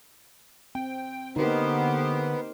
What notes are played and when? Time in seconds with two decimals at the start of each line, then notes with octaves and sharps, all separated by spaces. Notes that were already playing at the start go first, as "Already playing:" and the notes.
0.75 C4 G5
1.36 D3 A#3 B3 D#4 G4 A#4 C5